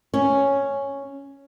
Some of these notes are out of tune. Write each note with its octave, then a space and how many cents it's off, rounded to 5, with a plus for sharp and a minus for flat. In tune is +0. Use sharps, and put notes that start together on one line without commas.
C#4 +0